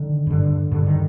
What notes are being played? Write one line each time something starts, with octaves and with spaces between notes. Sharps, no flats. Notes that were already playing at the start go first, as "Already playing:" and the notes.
Already playing: D3 D#3
G2 D3
G2 D3
D#3